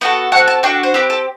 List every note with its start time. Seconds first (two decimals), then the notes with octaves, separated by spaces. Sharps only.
0.01 B3 F#4 A4 G5
0.32 C4 F#4 A4 F#5
0.48 A5
0.63 D4 F#4 A4 G5
0.83 C5
0.94 C4 G4 B4
1.10 A4